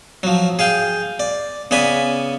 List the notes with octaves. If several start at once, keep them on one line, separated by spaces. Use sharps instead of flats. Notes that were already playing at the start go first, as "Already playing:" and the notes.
F3 F#3
G#4 F5 G5
D5
C#3 B3 D5 G#5 B5